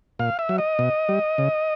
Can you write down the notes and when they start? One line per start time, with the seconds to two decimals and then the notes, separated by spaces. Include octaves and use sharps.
0.19 A#2 F5
0.39 E5
0.49 F#3
0.58 D#5
0.79 B2
1.09 G3
1.38 C#3